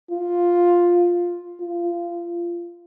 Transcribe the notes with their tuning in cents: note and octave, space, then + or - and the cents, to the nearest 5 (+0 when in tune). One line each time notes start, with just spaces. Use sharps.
F4 +5
F4 -20